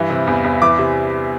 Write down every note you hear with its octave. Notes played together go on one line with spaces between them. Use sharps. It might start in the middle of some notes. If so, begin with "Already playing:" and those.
Already playing: G2 E3
C3
E2
E2
E3 D6
C3